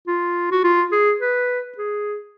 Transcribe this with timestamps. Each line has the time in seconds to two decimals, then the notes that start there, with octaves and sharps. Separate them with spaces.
0.07 F4
0.52 F#4
0.64 F4
0.92 G#4
1.20 B4
1.77 G#4